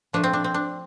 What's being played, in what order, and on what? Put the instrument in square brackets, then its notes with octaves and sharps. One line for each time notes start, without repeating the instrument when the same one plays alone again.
[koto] A#2 F3 A3 D4
C4
D4
C4
D4